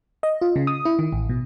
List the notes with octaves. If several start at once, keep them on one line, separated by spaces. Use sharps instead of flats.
D#5
F4
C#3
D#6
E4
D#3
A1
B2